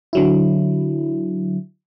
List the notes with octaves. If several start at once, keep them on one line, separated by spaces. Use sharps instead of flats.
D3 F#3 E4